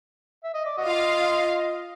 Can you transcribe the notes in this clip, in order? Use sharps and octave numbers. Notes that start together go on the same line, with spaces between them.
E5
D#5
D5
F#4 D#5
F4 F5